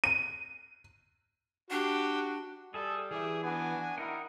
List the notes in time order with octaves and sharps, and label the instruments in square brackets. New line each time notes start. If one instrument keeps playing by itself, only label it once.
[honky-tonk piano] D#7
[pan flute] D4 [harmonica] F#4 [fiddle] G4
[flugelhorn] G3 [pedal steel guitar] G#4 E5 [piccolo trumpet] A4
[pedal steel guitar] E3 [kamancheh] G4 E5 [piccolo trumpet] G#4
[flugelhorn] B3 [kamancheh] D4 F#4 [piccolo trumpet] G#5
[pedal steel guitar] D#4 F#5 G5 [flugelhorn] E4 [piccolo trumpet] A#4